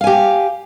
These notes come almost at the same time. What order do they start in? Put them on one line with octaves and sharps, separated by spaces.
F5 G#5 G4